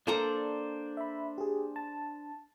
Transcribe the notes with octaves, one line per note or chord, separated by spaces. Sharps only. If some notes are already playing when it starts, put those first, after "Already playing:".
A#3 D4 A4 C5 D5 A#5
E5 B5
G4 G#4
A5